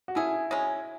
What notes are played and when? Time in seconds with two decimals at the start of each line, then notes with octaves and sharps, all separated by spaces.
0.08 F#4
0.15 A3 C#4 E4 G#4
0.51 C#3 G#3 C#4